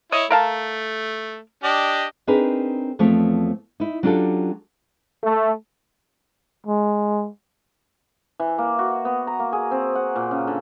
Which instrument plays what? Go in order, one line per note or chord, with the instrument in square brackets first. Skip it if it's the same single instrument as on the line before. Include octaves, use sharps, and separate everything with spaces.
[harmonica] E4 C#5 [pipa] D#5
[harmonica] A3 [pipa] A#4 F5 A5
[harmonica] D4 G4 D#5
[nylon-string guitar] C4 D4 D#4 G#4 A#4 B4
E2 F3 A3 C4 C#5
D#4 E4
F#3 C#4 D4 F4 G4 A4
[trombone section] A3
[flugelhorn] G#3
[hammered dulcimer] E3
A#3
F#4
B3
A#5
A#3
G#4
C4
F#5
A#2
C#3
D3